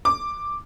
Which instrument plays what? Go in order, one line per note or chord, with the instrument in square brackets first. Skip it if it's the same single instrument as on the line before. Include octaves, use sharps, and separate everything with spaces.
[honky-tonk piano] D6